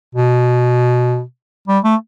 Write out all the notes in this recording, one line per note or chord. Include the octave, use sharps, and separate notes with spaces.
B2
G3
A3